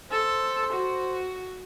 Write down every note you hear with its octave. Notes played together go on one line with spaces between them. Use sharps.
A4 C5
F#4